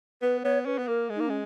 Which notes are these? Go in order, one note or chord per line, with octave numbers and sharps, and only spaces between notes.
B3 B4
B3 C#5
C#4 B4
B3
A#3 A#4
G#3
A#3 D#4
G#3 C#4